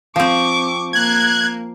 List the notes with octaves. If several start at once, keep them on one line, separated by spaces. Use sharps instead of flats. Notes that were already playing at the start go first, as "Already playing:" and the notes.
F3 C4 C#6 D6
A#3 F#6 G#6